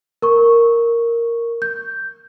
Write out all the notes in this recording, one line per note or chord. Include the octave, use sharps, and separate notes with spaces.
A#4 C#6
G6